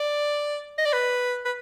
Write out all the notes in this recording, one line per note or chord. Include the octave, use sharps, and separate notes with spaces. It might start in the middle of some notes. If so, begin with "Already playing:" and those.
Already playing: D5
D#5
D5
B4
B4